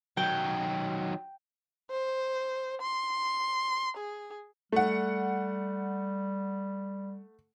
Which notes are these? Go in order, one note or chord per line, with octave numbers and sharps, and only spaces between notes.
D#3 F#3 G5
C5
C6
G#4
G3 A3 F#5